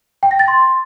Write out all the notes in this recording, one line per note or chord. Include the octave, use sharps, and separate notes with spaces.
G5
A#6
A6
C6